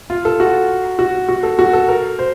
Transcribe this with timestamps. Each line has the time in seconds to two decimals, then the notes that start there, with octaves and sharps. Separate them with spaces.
0.10 F4
0.25 A4
0.40 F#4
0.99 F#4
1.29 F#4
1.43 A4
1.59 F#4
1.73 A4
1.88 A#4
2.19 C5